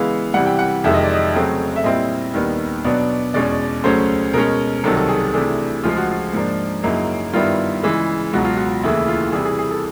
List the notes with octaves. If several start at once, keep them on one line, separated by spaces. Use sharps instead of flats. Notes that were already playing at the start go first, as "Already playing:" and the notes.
Already playing: C#3 E3 G#3 B3 F5
C3 E3 G3 F#5
G5
F#5
F2 C3 D#3 G#3 E5
D#5
D5
D#5
C#3 F#3 A3 C4
E5
A#2 G3 C4 E4 D#5
D#2 D#3 G3 B3
B2 F#3 B3 D4 D5
E2 B2 G#3 C#4 D5
D2 C#3 F#3 A3 C#4 C5
B2 G#3 C#4 A#4
C2 C3 D#3 F#3 A4
A4
G#4
C3 E3 A3 D4 G#4
D2 C#3 F3 G#3 F4
F#4
F4
G#2 F3 A#3 D4
F#2 C#3 F#3 A#3 D#4 E4
G2 D#3 G3 B3 E4 F4
C#3 E3 G#3
C#2 B2 F#3 F#4
F4
F#4
D#2 C#3 E3 A3 E4
F4
C3 E3 G3 G#4
G#4
G#4
A4